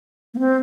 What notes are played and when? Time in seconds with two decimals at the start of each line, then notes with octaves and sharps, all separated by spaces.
0.34 A#3
0.39 C4